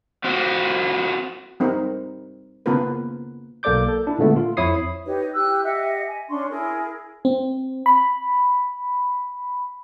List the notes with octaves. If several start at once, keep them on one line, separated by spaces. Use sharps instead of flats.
C4 F4 F#4
G3 C4 D#4 A#4
C#3 A#3 B3 F4 A#4 B4
B1 A#3 A4 D5 D6 G6
A4
D4 E4
A#2 D3 G#3 A3 B3
F4
F2 E4 C#5 D#6 C7
D#4 G4 B4 C#5
E4 G4 E6 F#6
G4 D#5 E5 F#5
G#5
C#4 D4 C6 C#6
E4 G#4 A#4
C4
B5